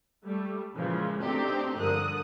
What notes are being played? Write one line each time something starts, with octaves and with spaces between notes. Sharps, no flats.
G3 A3
A#2 C#3 E3 F3 G#3
B2 A3 C4 D4 D#4 G4
G2 D3 F3 A#4 D#6 F#6